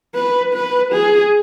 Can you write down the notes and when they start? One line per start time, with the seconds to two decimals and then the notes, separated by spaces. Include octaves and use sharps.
0.15 B4
0.54 B4
0.92 G#4